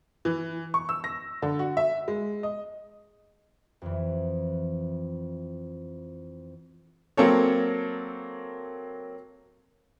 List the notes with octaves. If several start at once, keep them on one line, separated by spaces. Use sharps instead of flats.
E3
C#6
E6
A#6
D3
F#4
E5
G#3
D#5
F2 E3
F#3 A#3 C4 A4 C#5